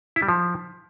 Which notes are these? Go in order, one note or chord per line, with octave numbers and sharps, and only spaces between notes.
E4
G3
F3